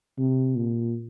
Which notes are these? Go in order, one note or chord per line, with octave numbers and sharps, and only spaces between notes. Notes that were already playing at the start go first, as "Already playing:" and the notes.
C3
A#2